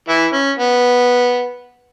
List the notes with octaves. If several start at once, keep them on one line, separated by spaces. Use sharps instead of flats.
E3 E4
C#4
B3